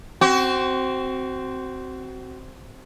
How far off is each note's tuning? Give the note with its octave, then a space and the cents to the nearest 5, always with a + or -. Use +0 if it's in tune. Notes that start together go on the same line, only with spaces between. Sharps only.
C4 +0 F#4 +25